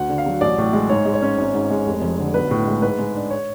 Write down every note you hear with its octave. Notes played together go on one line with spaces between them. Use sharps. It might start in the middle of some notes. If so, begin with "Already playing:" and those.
Already playing: D2 F#5
D3
F5
F#3
A1 D5
A2
G#3
G#2 C#5
G#3
C#5
C#4
G#1
G#2
G#3
F1
F2
D3
B1 B4
A2
G#3
G#2 B4
G#3
D4
C#5